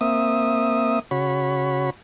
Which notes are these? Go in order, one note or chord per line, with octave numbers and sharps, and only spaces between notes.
A#3 C4 E5 D#6
C#3 F#4 C#5 B5